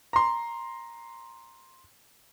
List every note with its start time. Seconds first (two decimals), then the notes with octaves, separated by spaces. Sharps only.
0.13 A#5 C6